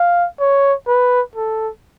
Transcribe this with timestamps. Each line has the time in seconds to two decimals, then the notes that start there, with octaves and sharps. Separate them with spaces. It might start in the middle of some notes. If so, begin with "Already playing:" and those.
Already playing: F5
0.40 C#5
0.88 B4
1.36 A4